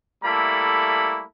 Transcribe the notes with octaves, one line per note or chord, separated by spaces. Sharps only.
G3 A3 A#3 E4 A4 B5